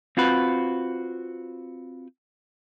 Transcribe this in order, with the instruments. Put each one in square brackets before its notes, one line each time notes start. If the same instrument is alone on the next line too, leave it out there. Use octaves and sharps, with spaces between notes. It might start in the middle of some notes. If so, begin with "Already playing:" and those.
[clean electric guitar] C4 F4 F#4 B4